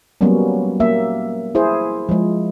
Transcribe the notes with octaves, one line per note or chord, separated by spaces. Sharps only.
F#3 G3 A#3 B3 C#4
A#3 E5
E4 G#4 C5
F3 G#3